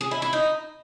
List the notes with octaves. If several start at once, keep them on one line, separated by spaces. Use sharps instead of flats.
G#4
E4
E4
D#4